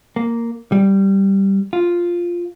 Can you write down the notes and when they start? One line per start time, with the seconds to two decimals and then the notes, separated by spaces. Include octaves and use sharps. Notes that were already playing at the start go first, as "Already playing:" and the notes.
0.16 A#3
0.72 G3
1.73 F4